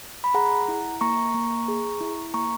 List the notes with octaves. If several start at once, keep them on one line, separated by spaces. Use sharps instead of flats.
B5
G#4 F#5 A#5
E4
A#3 A#5 C#6
A#3
G#4
E4
A#3 A#5 C#6